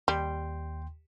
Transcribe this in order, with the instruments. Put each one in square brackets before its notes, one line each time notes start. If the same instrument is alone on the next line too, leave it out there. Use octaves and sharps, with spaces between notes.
[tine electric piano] D#2 G5 C6 [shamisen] G3